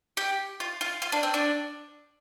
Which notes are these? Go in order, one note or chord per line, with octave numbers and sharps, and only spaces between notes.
G4
F4
F4
F4
D4
C4
D4